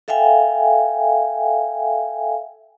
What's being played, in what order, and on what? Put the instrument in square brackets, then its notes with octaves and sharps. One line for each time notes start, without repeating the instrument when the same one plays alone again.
[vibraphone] A4 E5 F5 G5 G#5